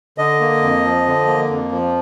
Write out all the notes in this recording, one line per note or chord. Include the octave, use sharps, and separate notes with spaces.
D3 D#5
A#3
F2
F3
D3
A#3
F2
F3